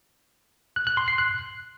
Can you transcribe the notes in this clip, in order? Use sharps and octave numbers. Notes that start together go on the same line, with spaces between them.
F#6
F#6
C6
C7
F#6